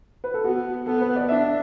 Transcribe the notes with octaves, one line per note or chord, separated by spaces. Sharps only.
B4
A4
B3 F#4
B3 A4
B4
D5
D4 E5